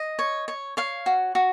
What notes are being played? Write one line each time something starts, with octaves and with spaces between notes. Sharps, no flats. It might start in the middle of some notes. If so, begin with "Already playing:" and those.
Already playing: D#5
C#5
C#5
C#5 F5
F#4
F#4